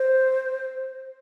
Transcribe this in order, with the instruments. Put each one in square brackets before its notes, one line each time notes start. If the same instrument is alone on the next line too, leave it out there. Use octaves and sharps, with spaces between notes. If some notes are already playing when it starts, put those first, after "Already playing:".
Already playing: [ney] C5